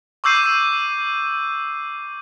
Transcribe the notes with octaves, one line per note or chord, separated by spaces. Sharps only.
C#6 D6 E6 G6 C7 D#7